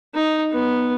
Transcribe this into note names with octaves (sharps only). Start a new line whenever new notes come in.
D#4
B3